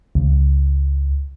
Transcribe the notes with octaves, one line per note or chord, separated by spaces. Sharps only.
C#2